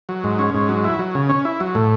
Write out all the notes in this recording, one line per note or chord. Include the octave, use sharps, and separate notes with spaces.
F#3
G#2
C#4
G#2
F#3
E4
F#3
C#3
C#4
E4
F#3
A2